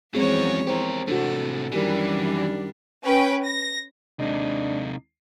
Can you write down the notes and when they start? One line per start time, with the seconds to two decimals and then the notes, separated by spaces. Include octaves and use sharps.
0.15 E2 F3 F#3 G#3 C4 C#4 G#4 C#5
0.67 E3 G4 A#4 C5
1.08 A2 C3 D4 F#4 A4
1.72 F#2 D#3 E3 G3 D4 G4 A#4
2.17 D#3
3.04 C#4 B4 G5
3.44 A#6
4.20 D#2 C3 G#3 D4 D#4 D#5